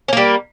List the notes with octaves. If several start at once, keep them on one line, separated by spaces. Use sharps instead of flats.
G3 A#3 C#4